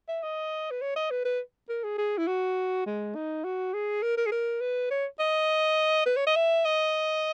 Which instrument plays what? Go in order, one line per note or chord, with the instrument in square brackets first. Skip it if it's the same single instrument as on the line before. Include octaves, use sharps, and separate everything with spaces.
[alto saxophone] E5
D#5
B4
C#5
D#5
B4
B4
A#4
G#4
G#4
E4
F#4
G#3
D#4
F#4
G#4
A#4
A#4
G#4
A#4
B4
C#5
D#5
B4
C#5
D#5
E5
D#5